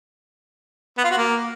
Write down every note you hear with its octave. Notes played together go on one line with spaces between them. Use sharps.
B3
F4
F#4
A#3